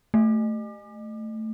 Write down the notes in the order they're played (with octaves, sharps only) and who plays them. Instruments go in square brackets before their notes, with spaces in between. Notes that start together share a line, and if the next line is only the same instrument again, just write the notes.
[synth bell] A3